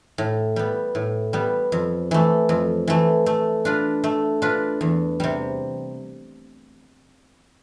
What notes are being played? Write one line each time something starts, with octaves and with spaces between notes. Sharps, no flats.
A2
G3 B3
A2
G3 B3
F2
E3 A3
F2
E3 A3
A3
D4 F4 B4
A3
D4 F4 B4
E2
C3 G3